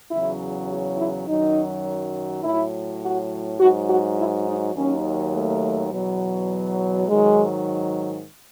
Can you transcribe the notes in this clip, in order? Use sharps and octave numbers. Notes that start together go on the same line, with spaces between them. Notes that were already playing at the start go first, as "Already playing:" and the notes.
E2 C#3 F#3 E4
F#4
E4
F#2 D#3 F#3 D#4
A2 F#3 E4
F#4
G#2 F#3 F#4
F#4
E4
D#4
D#2 D#3 F#3 C#4
A3
E2 B2 F#3
G#2 D#3 F#3 G#3